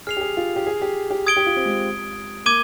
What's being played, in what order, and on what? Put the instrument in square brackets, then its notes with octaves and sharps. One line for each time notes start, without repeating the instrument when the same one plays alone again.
[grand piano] G#4 [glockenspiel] F6 C7 F7
[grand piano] G4
G#4
F4
G4
G#4
G4
G4
[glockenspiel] D#6 G#6 D7 G7
[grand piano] G4
F4
C4
G#3
[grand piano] A#3 [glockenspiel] D6 G#6 D#7 G7